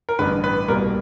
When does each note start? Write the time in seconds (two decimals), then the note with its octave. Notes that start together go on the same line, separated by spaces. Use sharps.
0.09 A#4
0.19 A1 G2 D3 B4
0.44 B4
0.68 C2 B2 G3 A#3 A#4